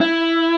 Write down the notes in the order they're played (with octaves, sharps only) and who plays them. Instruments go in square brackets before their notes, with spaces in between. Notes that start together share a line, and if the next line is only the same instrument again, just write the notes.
[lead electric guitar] E4